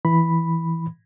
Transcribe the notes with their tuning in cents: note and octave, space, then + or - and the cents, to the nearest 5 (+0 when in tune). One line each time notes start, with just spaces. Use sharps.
E3 +0 B5 +0